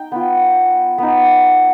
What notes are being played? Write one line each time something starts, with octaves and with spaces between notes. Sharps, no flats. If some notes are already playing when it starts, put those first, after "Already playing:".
Already playing: D#4 G5
B3 F4
B3 D#4